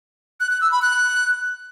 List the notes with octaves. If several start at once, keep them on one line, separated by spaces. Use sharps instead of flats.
F#6
F#6
E6
B5
F#6